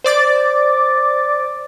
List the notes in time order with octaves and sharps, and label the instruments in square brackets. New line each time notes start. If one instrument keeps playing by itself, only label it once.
[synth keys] C5 D5 D6 A6